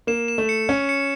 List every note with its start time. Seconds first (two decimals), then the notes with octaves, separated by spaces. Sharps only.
0.07 A#3 E7
0.28 E7
0.38 A3
0.49 C#7
0.69 C#4 C#7
0.89 C#7